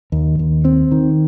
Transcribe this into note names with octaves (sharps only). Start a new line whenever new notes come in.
D#2
D#2
C4
D#3